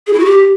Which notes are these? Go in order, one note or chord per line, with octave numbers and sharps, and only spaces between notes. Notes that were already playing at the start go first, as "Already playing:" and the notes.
G#4
E4
F#4
G4